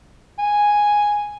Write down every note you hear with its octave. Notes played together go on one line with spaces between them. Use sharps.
G#5